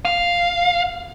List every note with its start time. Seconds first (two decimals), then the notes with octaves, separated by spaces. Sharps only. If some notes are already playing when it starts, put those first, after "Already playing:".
0.05 F5